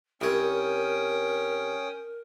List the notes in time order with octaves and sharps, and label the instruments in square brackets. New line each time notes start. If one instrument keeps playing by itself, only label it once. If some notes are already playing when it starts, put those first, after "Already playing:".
[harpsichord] C2 C#5 [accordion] C#4 G5 D#6 [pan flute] A#4